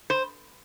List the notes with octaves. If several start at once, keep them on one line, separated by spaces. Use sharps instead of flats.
C5